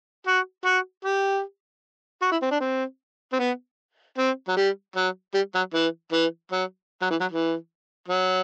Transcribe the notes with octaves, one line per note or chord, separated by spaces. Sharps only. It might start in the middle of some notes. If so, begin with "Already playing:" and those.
F#4
F#4
G4
F#4
E4
C4
D4
C4
C4
B3
C4
F#3
G3
F#3
G3
F#3
E3
E3
F#3
F#3
E3
F#3
E3
F#3